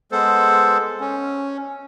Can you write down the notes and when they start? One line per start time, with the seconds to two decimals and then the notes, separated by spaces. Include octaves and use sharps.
0.12 G#3 B3 A4 C5
1.00 C#4